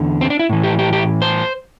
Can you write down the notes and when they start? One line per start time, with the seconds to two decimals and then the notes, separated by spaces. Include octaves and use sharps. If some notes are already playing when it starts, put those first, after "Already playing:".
Already playing: E2 D3
0.21 C4
0.30 D4
0.39 E4
0.49 A2 E3
0.63 G4
0.79 G4
0.93 G4
1.22 C5